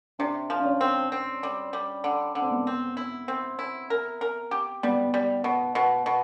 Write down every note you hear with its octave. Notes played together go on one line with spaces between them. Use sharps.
C3 D4
F3
D4
C#4
C4
C4
G3
G3
D3
D3
C4
B3
C4
E4
C4
E4
A#4
A#4
G4
G3 B3
G3
B2
B2
B2